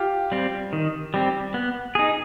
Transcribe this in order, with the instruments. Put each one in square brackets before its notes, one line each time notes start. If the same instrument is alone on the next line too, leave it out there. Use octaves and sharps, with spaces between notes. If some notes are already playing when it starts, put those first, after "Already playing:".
Already playing: [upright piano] F4 G4
[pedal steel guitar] G3 C4
D#3
G3 C4
B3
D#4 G#4